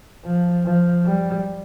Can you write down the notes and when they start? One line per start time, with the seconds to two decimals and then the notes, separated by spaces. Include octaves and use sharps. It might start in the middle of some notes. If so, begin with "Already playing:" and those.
0.25 F3
0.65 F3
1.05 G3